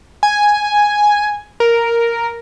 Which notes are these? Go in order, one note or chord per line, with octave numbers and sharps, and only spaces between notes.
G#5
A#4